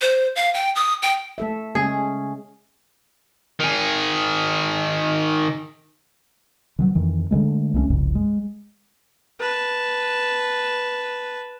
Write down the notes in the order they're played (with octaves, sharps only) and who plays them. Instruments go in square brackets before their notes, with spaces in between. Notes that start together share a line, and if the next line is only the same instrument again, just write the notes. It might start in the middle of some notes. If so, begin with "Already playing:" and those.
[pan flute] C5
F5
G5
D#6
G5
[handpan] A3 A4 E5
[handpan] C#3 G#3 C#4 [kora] G#4
[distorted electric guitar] D#3 G#4
[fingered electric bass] D#3 F3 F#3
F2 D#3 E3
D3 E3 G#3 A3
C2 A3 C4 C#4
F1 C2 G2 C#3
G#3
[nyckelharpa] B4 A5